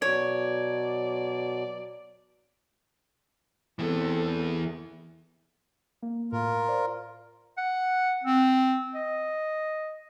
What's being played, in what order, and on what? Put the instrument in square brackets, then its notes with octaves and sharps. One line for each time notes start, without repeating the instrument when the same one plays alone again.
[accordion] B2 F#3 [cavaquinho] C#5 [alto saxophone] D5
[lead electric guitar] E3 B3 [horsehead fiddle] C4 A4
[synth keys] A#3
[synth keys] A2 [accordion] F4 A#4
[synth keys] C5 D5
[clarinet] F#5
C4
D#5